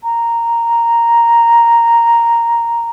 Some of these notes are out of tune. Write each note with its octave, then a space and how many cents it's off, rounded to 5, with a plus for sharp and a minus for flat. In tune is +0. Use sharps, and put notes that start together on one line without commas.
A#5 -5